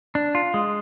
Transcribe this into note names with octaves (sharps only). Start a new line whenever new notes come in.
D4
F4
G#3